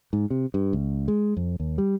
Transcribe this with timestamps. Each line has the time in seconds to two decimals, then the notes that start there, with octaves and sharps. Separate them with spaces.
0.13 G#2
0.30 C3
0.54 G2
0.73 C#2
1.08 G#3
1.37 F2
1.60 D#2
1.78 G3